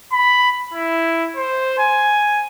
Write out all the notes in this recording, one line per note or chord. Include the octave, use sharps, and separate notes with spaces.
B5
E4
C5
G#5